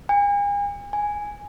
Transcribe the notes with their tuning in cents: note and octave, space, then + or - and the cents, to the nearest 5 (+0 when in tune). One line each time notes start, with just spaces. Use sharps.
G#5 -40
G#5 -5